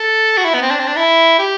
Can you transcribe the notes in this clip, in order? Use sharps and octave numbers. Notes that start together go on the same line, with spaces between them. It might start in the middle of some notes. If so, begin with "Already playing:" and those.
Already playing: A4
F#4
E4
B3
C4
D4
C4
D4
E4
G4